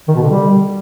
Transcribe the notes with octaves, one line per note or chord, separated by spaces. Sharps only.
D#3
B2
D3
G3